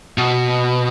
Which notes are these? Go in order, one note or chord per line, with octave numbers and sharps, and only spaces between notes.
B2